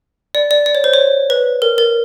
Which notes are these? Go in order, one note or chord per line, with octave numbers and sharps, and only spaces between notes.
D5
D5
D5
C#5
C5
C#5
B4
A#4
A#4